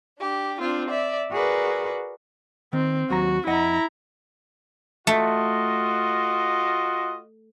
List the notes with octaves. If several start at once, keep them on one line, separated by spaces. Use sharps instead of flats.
D4 G4
C4 D4 F4
D5 E5
F#4 G#4 A#4 B4 D5
D#3 C4
D#2 F#3 F#4 A#5
F2 E4 D#5 F#5 A#5
A3 F4 F#4 D#5